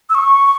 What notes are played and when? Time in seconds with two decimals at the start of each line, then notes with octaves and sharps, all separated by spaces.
0.10 E6
0.15 C#6